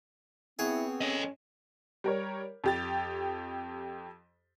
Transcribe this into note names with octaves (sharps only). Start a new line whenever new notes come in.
B3 C4 E4 G#4 C#5 F#5
C#4 A4 D#5
G3 A#4 C#5
F2 G4 A6